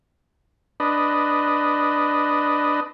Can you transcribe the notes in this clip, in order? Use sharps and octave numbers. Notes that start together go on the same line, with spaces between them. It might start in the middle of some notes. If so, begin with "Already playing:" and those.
D4 B4 D#5